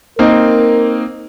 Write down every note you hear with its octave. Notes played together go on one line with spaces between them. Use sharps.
A#3 C4 D#4 A#4